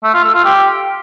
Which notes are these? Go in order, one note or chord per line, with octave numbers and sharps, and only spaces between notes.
A3
F4
A4
F4
G4